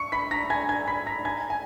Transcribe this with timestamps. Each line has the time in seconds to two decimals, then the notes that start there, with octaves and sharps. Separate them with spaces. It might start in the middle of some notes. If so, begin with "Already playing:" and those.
Already playing: C#6 C#7
0.12 B5 B6
0.31 A#5 A#6
0.50 G#5 G#6
0.69 G#5 G#6
0.88 B5 B6
1.06 A#5 A#6
1.25 G#5 G#6
1.50 G#5